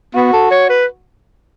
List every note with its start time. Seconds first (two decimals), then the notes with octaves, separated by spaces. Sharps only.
0.14 B3 F#4
0.33 A4
0.51 C#5
0.70 B4